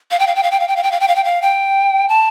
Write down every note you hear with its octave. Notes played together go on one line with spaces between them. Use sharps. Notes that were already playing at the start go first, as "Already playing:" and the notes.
F5
G5
F5
G5
F5
G5
F5
G5
F5
G5
F5
G5
F5
G5
F5
G5
A5